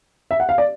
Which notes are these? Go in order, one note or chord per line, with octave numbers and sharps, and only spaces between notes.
E5
F#5
F5
D5